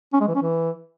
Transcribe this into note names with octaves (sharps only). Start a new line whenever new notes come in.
C#4
G#3
E3
C#4
E3